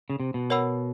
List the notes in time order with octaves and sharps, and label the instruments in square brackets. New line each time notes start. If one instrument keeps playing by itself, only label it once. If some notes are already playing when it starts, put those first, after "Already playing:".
[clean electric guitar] C#3
C3
B2
[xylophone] A#4 C#5 F#5 B5 E6